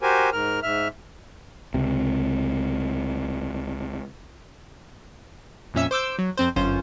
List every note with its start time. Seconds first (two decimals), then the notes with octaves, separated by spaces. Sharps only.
0.02 F#4 G4 A#4 C5 G#5
0.33 G#2 A#4 F6
0.63 G#2 E5 F6
1.74 C#2 C3
5.74 F2 A#2 C#4 E5 E6
5.91 C5 D6 E6 G6
6.19 F#3
6.37 F2 C4 C5
6.56 G1 F#2 C#4 F4 C5